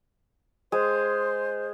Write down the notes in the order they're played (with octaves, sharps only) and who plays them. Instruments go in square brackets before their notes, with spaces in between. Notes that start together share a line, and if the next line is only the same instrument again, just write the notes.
[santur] G#3 [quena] C5